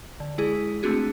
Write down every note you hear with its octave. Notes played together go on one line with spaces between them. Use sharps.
D3
G#3 E4 G#4
A3 C4 D4 F#4 G#4